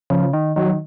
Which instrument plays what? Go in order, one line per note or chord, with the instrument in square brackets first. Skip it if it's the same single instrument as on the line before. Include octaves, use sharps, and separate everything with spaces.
[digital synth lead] C#3 [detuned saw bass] F3
[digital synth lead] D#3
[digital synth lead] D#3 [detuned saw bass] F#3